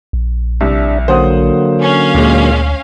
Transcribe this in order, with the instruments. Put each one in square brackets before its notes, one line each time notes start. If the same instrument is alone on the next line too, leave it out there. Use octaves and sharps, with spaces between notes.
[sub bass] A#1
[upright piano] C2 [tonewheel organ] D4 E5
[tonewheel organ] D3 F#3 A#3 [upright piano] C5 F#5 D#6
[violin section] C#4 F5
[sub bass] D2 [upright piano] A#2 G#3